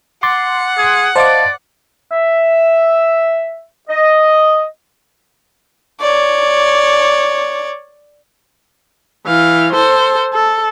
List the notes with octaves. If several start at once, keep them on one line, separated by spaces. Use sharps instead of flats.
F#5 C6 D6 A6
G#4
C5 D5 D#5 F5 A5 D6
E5
D#5
C#5 D5
E3 F5
A4 C5
A4